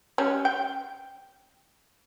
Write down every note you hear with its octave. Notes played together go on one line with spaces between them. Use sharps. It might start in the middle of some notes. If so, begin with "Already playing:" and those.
G3 G#3 C#4
G5